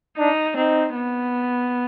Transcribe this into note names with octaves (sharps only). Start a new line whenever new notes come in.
D4 D#4
C4 D#4
B3